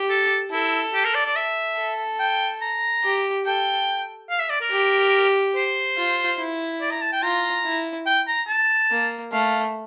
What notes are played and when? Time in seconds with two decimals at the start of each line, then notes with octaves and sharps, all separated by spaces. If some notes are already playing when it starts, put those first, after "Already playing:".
Already playing: G4
0.10 A4
0.51 E4 A4
0.94 G4
1.04 A#4
1.15 D5
1.25 D5
1.36 E5
1.77 A4
2.19 G5
2.61 A#5
3.04 G4
3.46 A4 G5
4.30 F5
4.40 E5
4.50 D5
4.61 A#4
4.71 G4
5.55 C5
5.97 F4
6.38 E4
6.81 D5
6.91 A#5
7.02 A5
7.12 G5
7.23 F4 A#5
7.65 E4
8.06 G5
8.27 A#5
8.48 A5
8.91 A#3
9.32 A3 F5